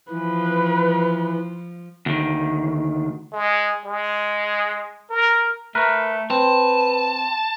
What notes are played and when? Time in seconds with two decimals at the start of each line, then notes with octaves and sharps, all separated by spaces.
0.11 E3 F3 B4
2.06 D2 D#3
3.33 G#3
3.85 G#3
5.10 A#4
5.75 A3 A#4 B4
6.31 C4 B4 A5